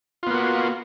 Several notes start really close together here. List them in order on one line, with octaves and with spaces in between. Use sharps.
F4 B3 A#3 F#4